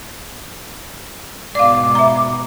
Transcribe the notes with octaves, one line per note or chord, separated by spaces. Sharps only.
G#2 B2 D5 F5 D6
E5 A#5